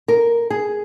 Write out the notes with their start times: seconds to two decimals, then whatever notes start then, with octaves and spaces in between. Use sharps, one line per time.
0.08 A#4
0.50 G#4